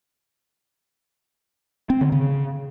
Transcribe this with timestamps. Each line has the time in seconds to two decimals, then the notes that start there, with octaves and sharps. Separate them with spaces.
1.90 C4
2.01 D3
2.12 C#3